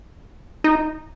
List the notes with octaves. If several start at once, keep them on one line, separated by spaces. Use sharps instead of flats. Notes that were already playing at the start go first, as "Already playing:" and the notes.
D#4